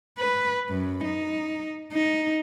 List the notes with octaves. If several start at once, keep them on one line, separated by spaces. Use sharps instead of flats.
B4
F#2
D#4
D#4